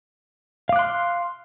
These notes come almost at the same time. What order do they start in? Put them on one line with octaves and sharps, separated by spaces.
F5 D6 F#6 C6 F6